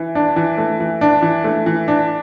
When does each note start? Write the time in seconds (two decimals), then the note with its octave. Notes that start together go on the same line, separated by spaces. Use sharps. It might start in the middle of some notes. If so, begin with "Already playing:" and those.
Already playing: E3
0.15 D4
0.36 E3
0.57 A3
0.80 E3
1.01 D4
1.23 E3
1.44 A3
1.66 E3
1.88 D4